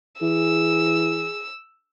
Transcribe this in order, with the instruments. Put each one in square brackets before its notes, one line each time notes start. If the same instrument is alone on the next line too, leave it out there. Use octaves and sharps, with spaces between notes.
[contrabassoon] E3 [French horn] G#4 [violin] E6